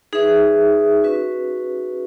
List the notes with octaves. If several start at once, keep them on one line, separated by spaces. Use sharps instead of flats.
D#4 G#4 B4 E5
C#4 F#4 B4